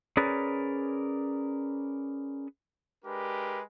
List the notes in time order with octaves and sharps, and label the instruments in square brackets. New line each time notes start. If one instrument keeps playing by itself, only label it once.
[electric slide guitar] C#4 G#4 A#4 B4 D5
[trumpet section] G#3 D4 G4 A#4 B4